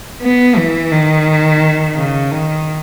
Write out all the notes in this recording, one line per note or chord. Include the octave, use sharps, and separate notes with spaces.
B3
E3
D#3
C#3
D#3